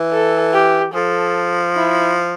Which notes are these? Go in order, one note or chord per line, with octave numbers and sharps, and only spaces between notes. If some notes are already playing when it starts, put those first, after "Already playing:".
Already playing: E3
A4
G4
F3 A4
E4